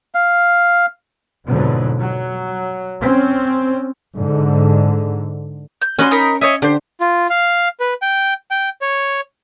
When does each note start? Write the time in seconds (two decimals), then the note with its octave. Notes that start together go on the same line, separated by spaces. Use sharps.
0.15 F5
1.47 F2 G#2 B2 D3 F#3
1.99 F#3
3.01 C4 C#4
4.16 G#2 D3
5.82 G6
5.99 C#4 F#4 B4 D#5 C6
6.11 D#4 A#4 B5
6.41 C#5 D#5 E5 G#5
6.62 D3 G4 C5
7.01 F4
7.30 F5
7.80 B4
8.02 G5
8.51 G5
8.81 C#5